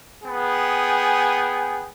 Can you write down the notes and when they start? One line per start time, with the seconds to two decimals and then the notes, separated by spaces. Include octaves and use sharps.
0.25 B3 G#4 G5 G#5